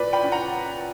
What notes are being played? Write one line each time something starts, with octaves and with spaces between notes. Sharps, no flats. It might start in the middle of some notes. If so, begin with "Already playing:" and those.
Already playing: A#2 B4 D5
G5 B5
C#4
F#5 A#5